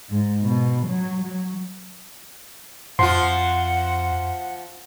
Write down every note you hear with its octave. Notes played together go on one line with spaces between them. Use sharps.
G#2
B2
F#3
F#3
F2 F3 F4 F#5 C6